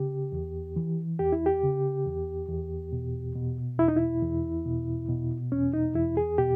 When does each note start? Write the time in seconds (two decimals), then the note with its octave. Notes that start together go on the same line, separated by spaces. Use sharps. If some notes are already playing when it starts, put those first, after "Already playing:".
Already playing: C#3 G4
0.32 E2
0.76 E3
1.19 E2 G4
1.32 E4
1.46 G4
1.63 C#3
2.06 E2
2.49 E2
2.92 B2
3.36 B2
3.79 E2 E4
3.88 D#4
3.97 E4
4.22 E2
4.66 B2
5.09 B2
5.52 E2 C#4
5.73 D#4
5.95 E2 E4
6.17 G#4
6.38 B2 G4